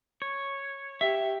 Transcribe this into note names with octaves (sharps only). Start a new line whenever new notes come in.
C#5
G4 E5